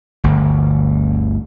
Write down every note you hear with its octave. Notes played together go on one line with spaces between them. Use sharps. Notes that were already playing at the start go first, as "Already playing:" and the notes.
G1 D2